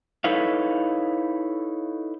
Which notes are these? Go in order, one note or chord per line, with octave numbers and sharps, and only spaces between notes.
D#4 E4 A4 B4 C#5 F5